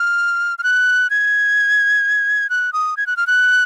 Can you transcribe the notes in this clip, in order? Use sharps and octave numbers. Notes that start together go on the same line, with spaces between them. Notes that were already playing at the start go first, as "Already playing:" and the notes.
Already playing: F6
F6
F#6
G#6
F#6
D#6
G#6
F#6
F6
F#6